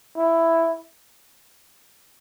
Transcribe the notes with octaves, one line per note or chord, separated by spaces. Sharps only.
E4